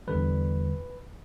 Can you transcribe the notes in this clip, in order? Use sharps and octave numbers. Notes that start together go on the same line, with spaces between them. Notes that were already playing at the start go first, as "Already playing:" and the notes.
E2 D3 G3 B4